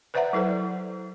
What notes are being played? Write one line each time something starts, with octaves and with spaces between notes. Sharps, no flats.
B4 C5 D5 E5 F#5 A#5
F#3 E4 A4 C5